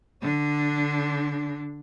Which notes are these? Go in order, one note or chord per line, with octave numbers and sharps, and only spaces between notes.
D3 D4